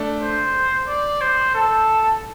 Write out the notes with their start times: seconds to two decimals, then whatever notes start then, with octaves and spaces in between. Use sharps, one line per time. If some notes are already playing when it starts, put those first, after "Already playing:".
Already playing: A3 D4
0.21 C5
0.87 D5
1.21 C5
1.55 A4